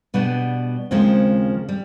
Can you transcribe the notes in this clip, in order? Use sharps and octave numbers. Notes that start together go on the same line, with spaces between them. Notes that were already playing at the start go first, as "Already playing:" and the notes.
B2 G3 B3 D4
D#2 C#3 F3 G#3 C4
G3